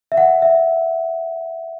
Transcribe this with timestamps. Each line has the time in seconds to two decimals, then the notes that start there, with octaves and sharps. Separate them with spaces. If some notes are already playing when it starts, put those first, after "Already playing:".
0.12 E5
0.17 F#5
0.42 E5